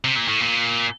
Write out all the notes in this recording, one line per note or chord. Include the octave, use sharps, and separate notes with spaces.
C3
A#2
A2
A#2